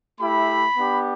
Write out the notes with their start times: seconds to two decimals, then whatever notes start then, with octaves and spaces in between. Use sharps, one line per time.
0.20 A3 E4 G4 B5
0.77 B3 D4 G4